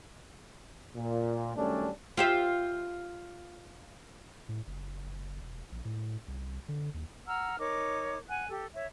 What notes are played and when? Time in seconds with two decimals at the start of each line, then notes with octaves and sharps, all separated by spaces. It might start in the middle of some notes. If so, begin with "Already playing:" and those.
0.95 A#2
1.56 F#2 D#3 G3 A3 C#4 D4
2.17 F4 G4 E5
4.49 A2
4.67 F#1
5.41 E1
5.72 A#1
5.85 A2
6.28 C2
6.68 D3
6.94 D#2
7.26 F#5 A#5 E6 F6
7.59 D#4 A#4 C#5 D6
8.28 F#5 G#5 F#6
8.48 G4 A4
8.74 C#5 E5